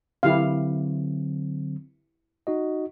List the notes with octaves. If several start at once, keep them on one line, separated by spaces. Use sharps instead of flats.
D3 F#3 C4 E4 G4 F5
D#4 F#4 D#5